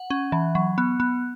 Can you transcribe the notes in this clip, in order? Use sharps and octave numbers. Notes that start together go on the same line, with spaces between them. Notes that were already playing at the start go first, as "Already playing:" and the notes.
Already playing: F#5
C#4
E3
F#3
B3
B3